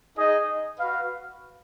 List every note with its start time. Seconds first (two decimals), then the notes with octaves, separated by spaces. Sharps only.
0.17 D#4 G#4 D#5
0.79 F#4 B4 F5